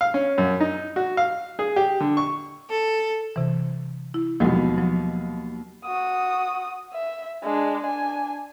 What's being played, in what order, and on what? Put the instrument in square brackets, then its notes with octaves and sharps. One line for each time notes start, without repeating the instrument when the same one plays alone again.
[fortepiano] F5
C#4
F#2
D#4
F#4
F5
G#4
G4
D3
C#6
[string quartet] A4
[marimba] C3 E3
E4
[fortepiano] D#2 B2 [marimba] F3 F#3 G#3
[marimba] F3 F#3
[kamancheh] F#4 D#6
E5
G#3 D4
D4 G#5